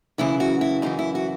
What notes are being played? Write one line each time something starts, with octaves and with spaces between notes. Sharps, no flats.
F#2 C#3 E3 E4
F#4
E4
F#2 C#3 E3 D#4
E4
F#4